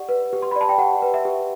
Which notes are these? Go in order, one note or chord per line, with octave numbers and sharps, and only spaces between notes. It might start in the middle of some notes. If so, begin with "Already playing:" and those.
Already playing: G4 D5 F#5
B4
G4
C6
B5
D5
A5
G5
G4 F#5
B4
E5
G4